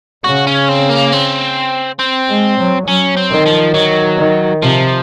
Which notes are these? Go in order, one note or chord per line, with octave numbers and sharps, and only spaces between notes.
C#3 F#4
C#4
C4
A#3
C4
C4
G#3
F#3
F#3 C#4
C4
D#3
F3
D#3 F#3
D#3
C3 F3